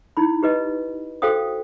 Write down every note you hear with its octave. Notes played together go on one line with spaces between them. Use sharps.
D#4 E4 B5
G4 B4 D#5
F#4 A4 C5 F5 G5 D#6